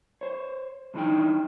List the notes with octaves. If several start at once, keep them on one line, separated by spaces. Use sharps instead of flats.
C5 C#5
G2 C#3 E3 D4 D#4 G5